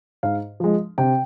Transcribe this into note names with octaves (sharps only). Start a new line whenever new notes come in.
G#2 F5
F3 G#3
C3 G5